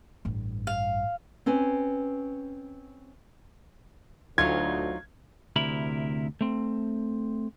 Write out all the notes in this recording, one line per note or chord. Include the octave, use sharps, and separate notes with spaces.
A1 G2
F5
C4 C#4 B4 G#5
D2 F#3 D#4 F4 G#6
D2 C3 E4 A#4 B5
A3 C4